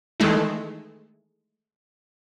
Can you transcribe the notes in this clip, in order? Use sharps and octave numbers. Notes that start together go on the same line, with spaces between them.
D#3 E3 G#3 A3 D#4 E4